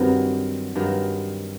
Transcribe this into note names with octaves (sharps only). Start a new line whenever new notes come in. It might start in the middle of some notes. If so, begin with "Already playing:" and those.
Already playing: G2 D#3 F#3 C4
G2 D#3 F#3